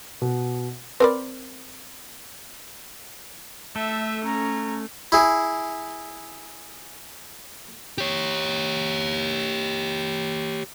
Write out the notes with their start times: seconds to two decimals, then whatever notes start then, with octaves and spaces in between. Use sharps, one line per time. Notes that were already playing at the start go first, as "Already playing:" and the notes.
0.22 B2
1.00 C4 A#4 B4 D5 B5
3.76 A3 A4 E5
4.25 C#4 A#5
5.12 E4 G#4
7.98 G4 C#5